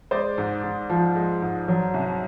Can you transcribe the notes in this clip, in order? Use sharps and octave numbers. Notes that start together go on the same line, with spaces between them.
G#3 C5 D5
G#2
G#2
F3
G#3
G#2
F#3
C2